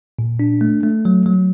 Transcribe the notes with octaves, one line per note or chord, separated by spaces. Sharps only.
A#2
D4
A3
A3
F#3
F#3